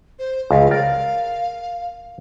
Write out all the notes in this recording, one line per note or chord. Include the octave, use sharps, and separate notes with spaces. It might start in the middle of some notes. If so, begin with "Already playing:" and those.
C5
C#2 F5
A#4 D5